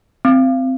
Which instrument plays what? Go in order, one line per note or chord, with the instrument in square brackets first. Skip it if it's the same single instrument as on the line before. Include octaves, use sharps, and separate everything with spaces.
[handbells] C4